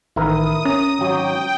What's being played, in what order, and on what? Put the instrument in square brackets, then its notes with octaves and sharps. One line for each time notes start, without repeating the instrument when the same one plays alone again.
[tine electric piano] A1 D#3 [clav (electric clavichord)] E4 A#4 B4 [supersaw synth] D#6
[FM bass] C#4 [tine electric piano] A#5
[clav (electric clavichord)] G#1 F#3 [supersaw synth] G5